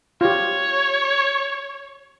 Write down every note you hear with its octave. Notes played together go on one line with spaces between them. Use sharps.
F4 G4 C#5